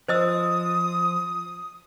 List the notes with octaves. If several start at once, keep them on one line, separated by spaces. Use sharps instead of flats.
F3 C5 D#5 D#6 E6